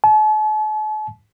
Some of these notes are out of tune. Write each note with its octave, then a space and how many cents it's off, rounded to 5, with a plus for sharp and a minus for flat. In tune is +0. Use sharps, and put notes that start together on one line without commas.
A5 -45